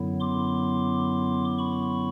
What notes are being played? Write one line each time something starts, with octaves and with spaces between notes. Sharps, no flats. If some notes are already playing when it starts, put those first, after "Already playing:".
Already playing: F#2 D3 F#3 B3 E4
C6 D6
B5 C#6